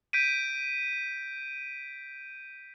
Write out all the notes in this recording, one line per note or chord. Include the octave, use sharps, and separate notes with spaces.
G6 B6 D7 D#7